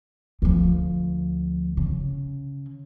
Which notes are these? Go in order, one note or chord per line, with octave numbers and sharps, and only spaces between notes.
D2 F3
C#3